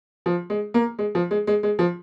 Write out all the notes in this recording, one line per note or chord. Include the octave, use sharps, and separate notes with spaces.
F3
G#3
A#3
G#3
F3
G#3
G#3
G#3
F3